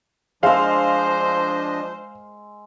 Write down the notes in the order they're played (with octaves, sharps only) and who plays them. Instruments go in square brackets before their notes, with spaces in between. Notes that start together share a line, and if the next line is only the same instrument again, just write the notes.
[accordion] F3 D4 D#5 [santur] G#3 E6 [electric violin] C5 [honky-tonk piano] F5